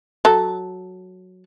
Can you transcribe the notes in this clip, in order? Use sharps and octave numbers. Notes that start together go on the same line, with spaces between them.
F#3 A4